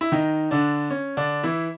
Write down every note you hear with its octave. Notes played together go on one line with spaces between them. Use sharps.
E4
D#3 D#4
D3 D4
C#4
D3 D4
E3 E4